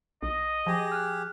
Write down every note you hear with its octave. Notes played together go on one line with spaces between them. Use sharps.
B1 D#5
F3 G4 G#4
F6 F#6